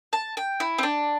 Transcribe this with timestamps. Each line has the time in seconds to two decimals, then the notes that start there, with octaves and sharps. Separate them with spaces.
0.13 A5
0.37 G5
0.60 E4
0.78 C4
0.83 D4